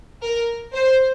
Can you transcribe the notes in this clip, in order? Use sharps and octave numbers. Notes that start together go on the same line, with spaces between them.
A#4
C5